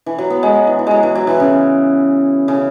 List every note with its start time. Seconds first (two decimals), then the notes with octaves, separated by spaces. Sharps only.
0.06 E3
0.18 F#3
0.30 B3
0.43 G#3
0.55 F#3
0.67 E3
0.79 E3
0.87 F#3 G#3
1.03 E3
1.15 F#3
1.27 E3
1.40 C#3
2.48 C#3